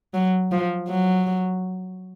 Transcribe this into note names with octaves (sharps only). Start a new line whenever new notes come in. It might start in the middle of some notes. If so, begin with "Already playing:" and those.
F#3
F3
F#3